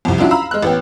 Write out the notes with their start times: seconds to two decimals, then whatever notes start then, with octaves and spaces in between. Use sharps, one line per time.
0.05 C2 F2
0.18 F#3 C#4 D4 E4 F4
0.31 F5 A#5 B5 E6
0.51 G#3 F6 F#6
0.63 A1 B3 G5